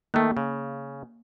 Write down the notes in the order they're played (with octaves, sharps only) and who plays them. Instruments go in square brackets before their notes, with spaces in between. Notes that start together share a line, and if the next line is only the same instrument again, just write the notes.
[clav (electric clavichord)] D#3 A3 [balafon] A#3
[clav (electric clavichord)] C#3